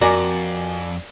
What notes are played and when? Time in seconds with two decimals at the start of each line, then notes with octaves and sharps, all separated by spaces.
0.01 F2 F#4 A#4 D5 G#5 D6